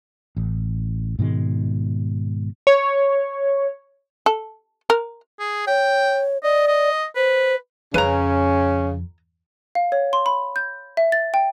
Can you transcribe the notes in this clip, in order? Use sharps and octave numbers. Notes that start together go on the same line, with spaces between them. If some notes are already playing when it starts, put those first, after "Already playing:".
A1
G#2 B2 D#3 G#3
C#5
A4
A#4
G#4
C#5 G5
D5 D#5
D#5
B4 C5
F2 C#3 C#4 B4 A#5
F5
C#5
C6
B5
G6
E5
A6
G5